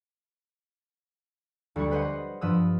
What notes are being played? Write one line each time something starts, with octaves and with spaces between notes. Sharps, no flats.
D2 G3 C#6
B4 C5 D#5 F#5
G2 F3 B4 D#6 E6